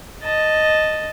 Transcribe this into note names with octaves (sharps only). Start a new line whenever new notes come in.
D#5 A5